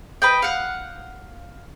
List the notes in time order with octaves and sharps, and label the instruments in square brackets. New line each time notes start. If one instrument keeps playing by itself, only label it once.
[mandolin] B4 D#5 G5
F5 F#5